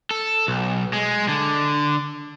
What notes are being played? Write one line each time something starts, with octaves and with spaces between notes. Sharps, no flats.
A4
B1
G#3
D3